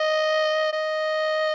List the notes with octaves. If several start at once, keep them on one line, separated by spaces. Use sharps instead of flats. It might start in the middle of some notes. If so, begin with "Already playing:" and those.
Already playing: D#5
D#5